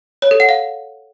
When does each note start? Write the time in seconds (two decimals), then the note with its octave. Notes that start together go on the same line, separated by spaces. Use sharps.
0.22 C#5
0.31 A4
0.40 F#5
0.49 F5